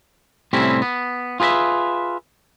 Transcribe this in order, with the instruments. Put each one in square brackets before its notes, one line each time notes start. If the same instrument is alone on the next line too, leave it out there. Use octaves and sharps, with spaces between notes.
[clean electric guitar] A2 C3 G3 C4 C#4 E4
B3
F4 G#4 B4 D5 E5